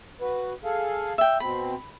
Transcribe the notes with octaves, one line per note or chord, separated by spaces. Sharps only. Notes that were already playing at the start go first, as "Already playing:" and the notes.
F#4 B4
G#4 A4 F5
E5 G5
B2 C4 B5